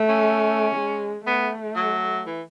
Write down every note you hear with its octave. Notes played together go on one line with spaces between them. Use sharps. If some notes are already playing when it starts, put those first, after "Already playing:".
Already playing: A3
C#4
G#3
A3 B3
F#3
E3